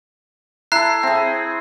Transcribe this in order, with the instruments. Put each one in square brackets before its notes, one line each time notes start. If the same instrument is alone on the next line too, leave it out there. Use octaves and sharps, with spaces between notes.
[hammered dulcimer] E4 A4 [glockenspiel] A#5 F#6 C7
[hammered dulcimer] C4 G#4